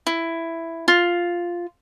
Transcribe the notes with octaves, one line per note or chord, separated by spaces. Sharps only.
E4
F4